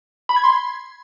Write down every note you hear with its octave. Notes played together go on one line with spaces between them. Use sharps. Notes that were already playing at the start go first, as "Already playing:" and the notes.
B5
G#6
C6